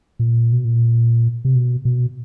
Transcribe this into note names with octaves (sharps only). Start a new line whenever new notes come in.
A#2
B2
A#2
C3
B2
B2